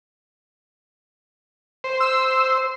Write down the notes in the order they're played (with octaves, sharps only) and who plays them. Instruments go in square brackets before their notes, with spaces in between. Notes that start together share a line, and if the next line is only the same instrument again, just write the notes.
[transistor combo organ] C5
[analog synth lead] E6